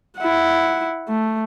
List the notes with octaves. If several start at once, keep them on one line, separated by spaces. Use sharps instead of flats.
E4 F#5
A3